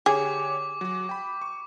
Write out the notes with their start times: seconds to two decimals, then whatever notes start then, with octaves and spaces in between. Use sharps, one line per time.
0.06 D3 G4 G#4 C#5 D6
0.81 F#3 F#4
1.09 G5 B5
1.42 C#6